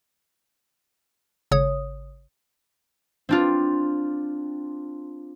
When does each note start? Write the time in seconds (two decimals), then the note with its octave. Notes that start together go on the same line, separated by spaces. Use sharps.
1.51 G#1 C#3 C#5 D#6
3.29 C4 D4 F4